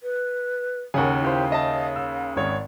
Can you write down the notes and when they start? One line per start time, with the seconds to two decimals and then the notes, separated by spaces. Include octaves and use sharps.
0.03 B4
0.94 D#2 C#3 A#4 F#5 G#5
1.22 E4 G4 C5 F5
1.52 D#5 E5 A5
1.96 E6
2.36 G#1 C#5 D5